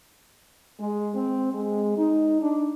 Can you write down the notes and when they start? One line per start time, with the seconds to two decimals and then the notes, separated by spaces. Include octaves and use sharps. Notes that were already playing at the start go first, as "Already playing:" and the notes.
0.80 G#3
1.15 C4
1.54 G#3
1.98 D#4
2.42 D4